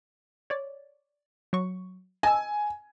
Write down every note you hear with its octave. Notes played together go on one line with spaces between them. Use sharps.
C#5 D5
F#3 C#6
D#5 G#5 A5 E6